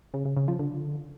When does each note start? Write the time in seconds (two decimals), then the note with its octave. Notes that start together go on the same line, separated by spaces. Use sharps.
0.14 C#3
0.25 C#3
0.37 C#3
0.48 F3
0.59 D3